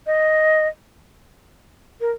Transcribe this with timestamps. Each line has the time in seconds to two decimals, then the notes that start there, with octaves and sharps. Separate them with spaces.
0.07 D#5
2.01 A#4